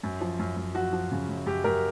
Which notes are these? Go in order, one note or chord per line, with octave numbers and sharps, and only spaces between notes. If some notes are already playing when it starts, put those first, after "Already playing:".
F#2
F3
F#2
F#2
F3 F#4
F3
C#3
F#2
F#2 G4
F#2 A#4